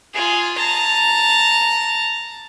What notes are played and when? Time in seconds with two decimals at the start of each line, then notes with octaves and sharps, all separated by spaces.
0.14 F4 G#4
0.58 A5 A#5